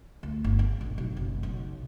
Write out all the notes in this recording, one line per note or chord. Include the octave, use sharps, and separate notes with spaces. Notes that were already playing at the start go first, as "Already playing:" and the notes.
D2
G1
G2
A#1
B1
F#1
B1